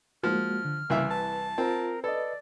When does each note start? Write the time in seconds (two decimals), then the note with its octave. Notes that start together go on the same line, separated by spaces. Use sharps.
0.23 F3 G#3 A#3 F#4 F6
0.65 D3
0.90 C2 C#3 E3 A#3 E5
1.11 B4 A5
1.58 C4 F4 A#4
2.04 A4 B4 D5 D#5